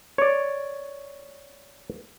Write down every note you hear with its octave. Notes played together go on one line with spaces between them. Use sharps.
C#5 D5